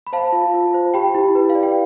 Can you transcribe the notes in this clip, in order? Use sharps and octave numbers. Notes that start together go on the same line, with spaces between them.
B5
C5 F5 A5
F4
F4
C5
G4 G5 B5
E4
B4
F5
D5
G5